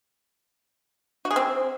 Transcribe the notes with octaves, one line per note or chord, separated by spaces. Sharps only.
F#4
G#4
C4